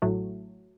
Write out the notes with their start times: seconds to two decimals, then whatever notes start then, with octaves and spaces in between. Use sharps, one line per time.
0.02 A1 A2 F#3 A3